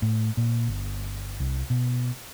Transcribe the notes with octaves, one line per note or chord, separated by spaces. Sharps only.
A2
A#2
G1
C2
B2